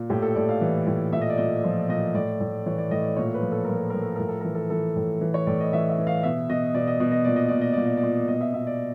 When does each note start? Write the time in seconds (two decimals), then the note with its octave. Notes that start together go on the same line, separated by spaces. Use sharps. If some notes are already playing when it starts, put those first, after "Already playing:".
Already playing: A#2
0.10 A2 G4
0.22 A4
0.35 A2 D5
0.49 F5
0.61 E3
0.87 A2
1.13 A#2 E5
1.21 D#5
1.30 D5
1.38 A#2 D#5
1.64 F3
1.89 A#2 D#5
2.14 A2 D5
2.40 A2
2.66 E3 C#5
2.78 D5
2.91 A2 D#5
3.04 D5
3.16 A#2 C#5
3.34 B4
3.42 F3
3.52 A4
3.65 F3 A#4
3.76 A4
3.90 F3 A#4
4.02 A4
4.16 A2 A#4
4.28 A4
4.41 E3 A#4
4.55 A4
4.70 E3 A4
4.96 A2
5.21 E3
5.34 C#5
5.47 A2 D5
5.60 D#5
5.73 E3 E5
5.89 E5
5.98 E3
6.07 F5
6.23 B2 E5
6.49 B2 D#5
6.74 B2 D5
6.87 D#5
7.00 B2 D5
7.12 D#5
7.25 A#2 D5
7.36 D#5
7.48 A#2 D5
7.61 D#5
7.73 A#2 D5
7.86 D#5
7.97 D5
8.03 A#2
8.28 B2 D#5
8.41 E5
8.53 B2 E5
8.67 D5